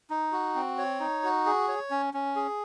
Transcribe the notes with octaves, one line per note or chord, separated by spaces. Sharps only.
D#4
F#4
C4
C#5
D#4
F#4
G#4
C#5
C#4
C#4
G#4